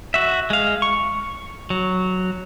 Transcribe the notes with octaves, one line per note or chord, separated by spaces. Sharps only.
F#4 E5
G#3 F5
C#6
F#3